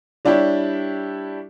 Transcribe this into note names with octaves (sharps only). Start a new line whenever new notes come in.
G3 D4 E4 G4 C#5